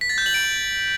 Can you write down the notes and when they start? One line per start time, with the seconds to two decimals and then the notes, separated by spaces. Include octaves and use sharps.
0.01 B6
0.09 A6
0.18 G6
0.26 F#7
0.34 D7